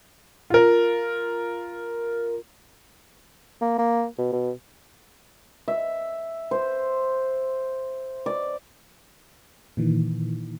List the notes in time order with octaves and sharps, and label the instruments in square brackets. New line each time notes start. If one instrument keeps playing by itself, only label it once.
[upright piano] F4 A#4
[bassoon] A#3
A#3
B2
B2
[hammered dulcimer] E5
C5
D5
[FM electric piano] A#2 D#3 E3